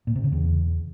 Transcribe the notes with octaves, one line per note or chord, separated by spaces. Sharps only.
A#2
C3
C#3
E2